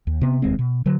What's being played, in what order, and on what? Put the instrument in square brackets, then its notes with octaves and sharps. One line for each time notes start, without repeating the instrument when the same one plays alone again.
[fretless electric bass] D#2
C3 B3
F1 D#2 G#3 C4
B2
D3 F#3